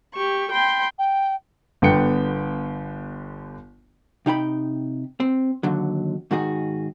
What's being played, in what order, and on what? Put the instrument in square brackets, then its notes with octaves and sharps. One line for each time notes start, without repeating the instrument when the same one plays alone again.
[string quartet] G4 C#6
G5 B5 C6
[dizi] G5
[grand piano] G1 D3 B3 G5 C#7
[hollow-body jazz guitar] C3 D#4 G5 B5
C4
D#2 D3 F#3
G#2 D#3 F#4 G#4